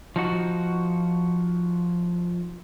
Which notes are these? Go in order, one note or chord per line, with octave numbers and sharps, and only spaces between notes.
F3 D#4 F#4